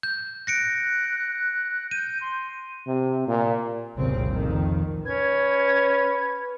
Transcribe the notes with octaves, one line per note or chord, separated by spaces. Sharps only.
G6
F#6 A#6 C#7 D7
G6 D#7
C6
C3
A#2
F1 C2 A#2 C#3 C4
F2 A#2 D#3
C#4 B4 G#6